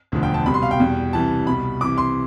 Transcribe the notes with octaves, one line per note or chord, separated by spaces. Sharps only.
E1 D2 D3 F3
G5
A5
C2 B2 G3 B5
C6
F5
G5
E2 B2 G3
C2 C3 E3 G3 A5
C2 B2 G3 B5
C2 C3 E3 D6
C6